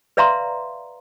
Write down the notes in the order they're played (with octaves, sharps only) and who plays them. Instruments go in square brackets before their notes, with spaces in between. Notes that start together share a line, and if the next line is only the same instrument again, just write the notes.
[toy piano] B4 D5 E5 F5 A#5 C6